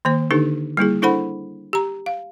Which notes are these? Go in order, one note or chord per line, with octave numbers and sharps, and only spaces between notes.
D#3 A#3 C5
D3 D4 D#4 G4 A4
G3 A#3 E4 G#4
D4 E4 A4 C5 F#5 B5
G4 A#5
F5